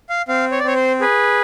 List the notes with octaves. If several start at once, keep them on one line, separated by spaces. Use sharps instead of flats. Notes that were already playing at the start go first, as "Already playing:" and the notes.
F5
C4 F5
C#5
D5
C4 C#5
C5
G#4 B4